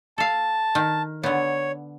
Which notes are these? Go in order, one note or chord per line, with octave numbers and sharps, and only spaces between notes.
A4 F5 A5
D#3
D3 B3 C#5